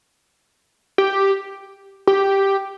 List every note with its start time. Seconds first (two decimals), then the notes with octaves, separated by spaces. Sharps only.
0.98 G4
2.07 G4